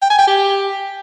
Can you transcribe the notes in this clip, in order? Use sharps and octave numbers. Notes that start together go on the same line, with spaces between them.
G5
G#5
G5
G4